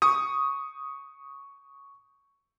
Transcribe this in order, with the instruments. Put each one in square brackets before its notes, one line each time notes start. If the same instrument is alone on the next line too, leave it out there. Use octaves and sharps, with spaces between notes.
[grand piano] C#6 D#6